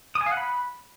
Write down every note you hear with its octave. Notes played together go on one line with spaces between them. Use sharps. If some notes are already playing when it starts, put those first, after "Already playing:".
D#6
G#5
F5
F#5
B5